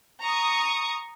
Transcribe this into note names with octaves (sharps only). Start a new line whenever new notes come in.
A#5 C#6 D#6